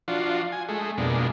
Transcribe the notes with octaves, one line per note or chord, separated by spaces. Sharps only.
F3 D4 F4 F#4
G#5
G#3 A3
F2 B2 G3 G#3 A#3 D4